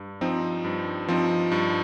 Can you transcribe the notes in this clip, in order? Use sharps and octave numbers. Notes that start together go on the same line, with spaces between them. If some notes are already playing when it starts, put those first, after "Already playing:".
Already playing: G2
F3 C4 D#4
G2
F3 C4 D#4
G2